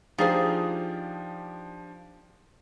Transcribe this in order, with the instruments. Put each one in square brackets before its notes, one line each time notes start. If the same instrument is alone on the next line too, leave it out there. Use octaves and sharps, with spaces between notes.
[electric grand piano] F3 D4 G4 [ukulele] D#4 G#4 C5 [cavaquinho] F4